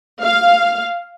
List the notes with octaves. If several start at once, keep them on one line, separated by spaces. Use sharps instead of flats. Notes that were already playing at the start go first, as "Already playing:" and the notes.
F5